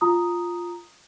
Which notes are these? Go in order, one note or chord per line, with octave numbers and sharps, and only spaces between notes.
F4 A#5 D#6